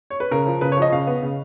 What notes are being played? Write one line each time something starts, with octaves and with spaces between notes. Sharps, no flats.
C#5
B4
C#3 A#4
F3
C#3 B4
C#5
F3 D#5
C#3 F5
B3
C#3